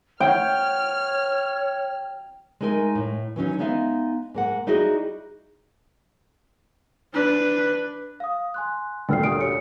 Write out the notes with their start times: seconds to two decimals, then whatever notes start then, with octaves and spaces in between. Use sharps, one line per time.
0.20 C#5 G5 F6
2.61 G#3 A3 D#4 A#4 G#5
2.95 A2
3.36 E3 F#3 C#4 D#4
3.59 G#3 B3 D#4 E5 F5
4.34 G#2 A#3 F#5
4.67 G3 D#4 E4 F#4 G#4 D#5
7.14 D4 B4
8.20 F5 D#6
8.54 G#5 C6 F#6
9.09 D2 G2 A#2 G5 F6 C7
9.24 G4 D#6 D7
9.37 C#5 C#7